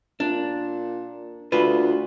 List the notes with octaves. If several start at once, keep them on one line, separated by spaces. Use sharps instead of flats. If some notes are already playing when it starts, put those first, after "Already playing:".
A#2 D4
D2 F4 B4